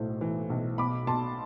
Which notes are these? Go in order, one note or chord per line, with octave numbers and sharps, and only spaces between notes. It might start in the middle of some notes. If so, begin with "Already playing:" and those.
Already playing: B1 A2 C5
E3
B1
B2 B5 D6
B2 A5 C6